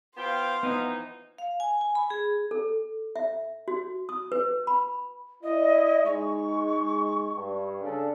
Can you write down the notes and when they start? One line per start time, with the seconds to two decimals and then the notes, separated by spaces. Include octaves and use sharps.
0.16 B3 F4 C5 F5 G5
0.63 E3 F3 B3 D#4
1.38 F5
1.60 G#5
1.81 G#5
1.95 B5
2.10 G#4
2.51 A4
3.16 E5
3.68 F#4
4.09 D#6
4.32 B4
4.67 B5
5.43 E4 D5 D#5
6.05 G#3 D#4 C#6
7.33 G2
7.82 C#3 D4 A4